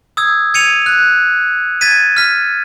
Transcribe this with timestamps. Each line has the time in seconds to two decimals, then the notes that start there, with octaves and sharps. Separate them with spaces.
0.17 D#6 E6 G#6
0.54 G#6 C#7 D#7 F7
0.86 F#6
1.81 G#6 A6 B6 D#7
2.17 F6 B6